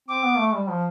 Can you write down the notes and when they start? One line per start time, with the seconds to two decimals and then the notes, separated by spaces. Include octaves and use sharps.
0.08 C4 D6
0.24 B3
0.38 A3
0.54 G3
0.69 F3